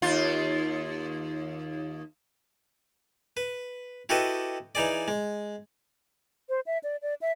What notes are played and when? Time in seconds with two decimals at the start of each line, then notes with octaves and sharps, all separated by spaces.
0.02 D#2 F4
3.37 B4
4.09 E4 F#4 G4 A4 B4 D#5
4.75 E3 D#4 G#4 D5
5.08 G#3
6.49 C5
6.66 E5
6.84 D5
7.02 D5
7.22 E5